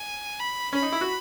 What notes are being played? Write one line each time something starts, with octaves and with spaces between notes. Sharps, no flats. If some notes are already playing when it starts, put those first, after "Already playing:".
Already playing: G#5
B5
C#4 B5
D#4
E4
F#4